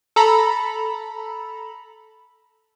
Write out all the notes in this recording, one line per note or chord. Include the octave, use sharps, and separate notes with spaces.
A4 A#5 B5